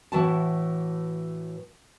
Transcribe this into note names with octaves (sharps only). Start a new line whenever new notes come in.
A2 E3 F#3 F#4 A5